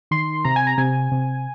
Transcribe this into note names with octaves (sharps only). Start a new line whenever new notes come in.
D#3 C6
C3 A#5
G#5
A#5
C3 G#5
C3